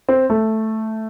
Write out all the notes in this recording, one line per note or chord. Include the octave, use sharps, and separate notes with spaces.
C4
A3